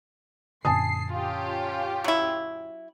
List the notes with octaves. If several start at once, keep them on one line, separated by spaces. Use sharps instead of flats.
F#2 A#2 D3 G#5 A5 D#6 C7
C#4 F4 G4
F#3 E4